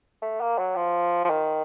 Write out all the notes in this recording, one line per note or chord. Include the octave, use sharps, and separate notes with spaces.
A3
A#3
F#3
F3
F3
D#3